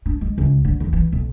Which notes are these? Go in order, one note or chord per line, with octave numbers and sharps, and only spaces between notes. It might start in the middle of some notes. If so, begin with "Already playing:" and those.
D4
G#3
C#2
D3
E2
E3
B1